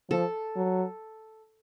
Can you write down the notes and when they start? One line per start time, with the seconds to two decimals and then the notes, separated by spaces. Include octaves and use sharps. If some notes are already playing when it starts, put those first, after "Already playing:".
0.11 F3 A4
0.56 F#3